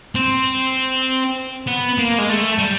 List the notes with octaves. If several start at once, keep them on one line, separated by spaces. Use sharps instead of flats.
C4
B3
A#3
G#3
A3
G3